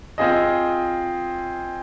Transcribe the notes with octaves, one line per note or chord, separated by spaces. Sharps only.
C4 F4 G#4 D#5